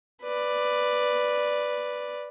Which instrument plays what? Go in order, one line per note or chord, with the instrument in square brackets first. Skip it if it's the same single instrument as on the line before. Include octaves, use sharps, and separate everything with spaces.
[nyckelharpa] B4 D5